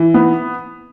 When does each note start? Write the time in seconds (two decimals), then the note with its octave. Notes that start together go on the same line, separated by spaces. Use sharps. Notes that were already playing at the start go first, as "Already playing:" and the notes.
Already playing: E3
0.14 B3